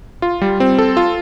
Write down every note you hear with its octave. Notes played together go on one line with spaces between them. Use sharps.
F4
G3
C4
A4
F4